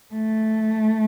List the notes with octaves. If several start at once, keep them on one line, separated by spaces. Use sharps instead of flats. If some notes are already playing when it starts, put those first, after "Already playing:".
A3